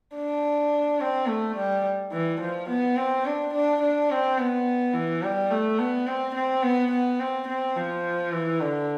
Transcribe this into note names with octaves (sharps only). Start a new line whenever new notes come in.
D4
C4
A3
G3
E3
F3
B3
C4
D4
D4
D4
C4
B3
E3
G3
A3
B3
C4
C4
B3
B3
C4
C4
F3
E3
D3